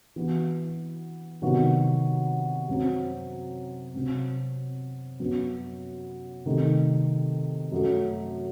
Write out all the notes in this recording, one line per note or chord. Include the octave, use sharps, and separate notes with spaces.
E3 B3 F#4
C3 D#3 F#3 B3 F#4
F#2 F#3 C4
C3 F#3 C4
F#2 F#3 B3
C3 D#3 A3
F#2 F#3 A3